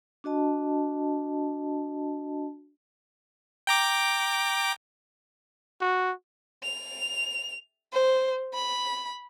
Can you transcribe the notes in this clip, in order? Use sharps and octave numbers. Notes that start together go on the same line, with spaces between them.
D4 F#4 D#5 A5
G5 A#5 D6
F#4
F7
C5
B5